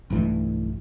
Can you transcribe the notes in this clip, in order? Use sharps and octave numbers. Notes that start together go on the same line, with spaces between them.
B1 G2 E3 A3